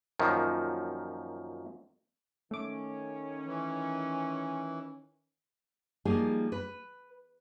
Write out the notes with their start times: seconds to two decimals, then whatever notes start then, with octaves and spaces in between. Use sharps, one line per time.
0.20 F#2 A#2 D#3 F3
2.51 D#3 A3 C#4 D6
3.46 E3
6.05 F3 G3 A#3 D#4 G#4
6.52 B4